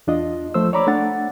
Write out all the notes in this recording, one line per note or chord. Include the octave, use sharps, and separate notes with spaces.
E2 D4 F4 D#5
F3 A3 C5 E6
C#5 D5 A#5 B5 D6
A3 D4 F#5 A6